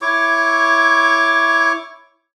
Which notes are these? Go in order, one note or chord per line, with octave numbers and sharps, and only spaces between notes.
E4 C#5 C#6 D6